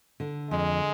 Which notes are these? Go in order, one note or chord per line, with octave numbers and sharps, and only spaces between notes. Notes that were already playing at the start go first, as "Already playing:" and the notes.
D3
F2 G#3